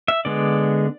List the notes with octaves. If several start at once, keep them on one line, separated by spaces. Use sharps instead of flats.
E5
D3 G#3 B3 D5